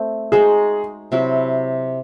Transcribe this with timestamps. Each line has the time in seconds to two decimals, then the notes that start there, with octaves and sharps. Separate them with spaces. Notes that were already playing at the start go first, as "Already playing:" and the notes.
Already playing: A3 C4
0.32 G#3 D#4 F#4 G#4 C5
1.12 C3 F#3 C4 E4